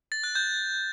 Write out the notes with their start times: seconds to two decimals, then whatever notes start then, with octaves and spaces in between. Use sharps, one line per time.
0.12 A6
0.24 F#6
0.35 G6